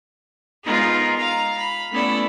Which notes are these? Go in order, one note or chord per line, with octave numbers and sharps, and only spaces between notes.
G#3 B3 D#4 F4 G#4 A#4
F5 A#5
B5
A3 B3 C#4 E4 A4 D5